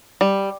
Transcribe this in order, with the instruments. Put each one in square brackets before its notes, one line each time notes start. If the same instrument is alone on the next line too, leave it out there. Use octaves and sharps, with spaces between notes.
[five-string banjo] G3